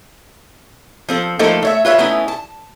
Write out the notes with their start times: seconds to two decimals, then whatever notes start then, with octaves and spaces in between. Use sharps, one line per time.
1.09 F3 C4 A4
1.39 F3 A3 A#3 D#4 A4 C5
1.62 A3 C#5 E5
1.85 F4 B4 C#5 E5
1.98 A3 B3 C#4 D#4 E4
2.28 A5